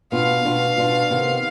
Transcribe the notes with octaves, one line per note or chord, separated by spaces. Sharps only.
B2 B3 D4 F4 F5
B2 B3 D4 F4
B2 B3 D4 F4
C3 D#3 B3